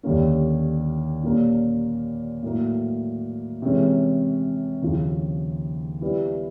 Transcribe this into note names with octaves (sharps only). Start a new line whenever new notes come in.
D#2 D3 G3 A#3 C#4
A#2 G3 A#3 C#4
A2 F#3 A#3
C3 E3 G#3 C#4
D#2 C#3 F3
G3 B3 E4